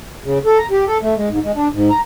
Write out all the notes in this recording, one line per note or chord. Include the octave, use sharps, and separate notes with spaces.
C#3
A4
A#5
G4
A4
A3
G#3
G#2
G#3
D4
G#2
A#5